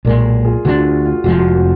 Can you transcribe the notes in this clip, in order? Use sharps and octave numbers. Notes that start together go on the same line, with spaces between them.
B1 A#2 G#3 A#4 D5
F4 G#4
D2 D3 G#3 D4 F#4
F4
F4
F1 F2 F3 G#3 F#4
F4
F#4
F4
F#4